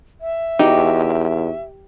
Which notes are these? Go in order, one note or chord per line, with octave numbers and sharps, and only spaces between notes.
E5
E2 D#4 F#4 G4 D#5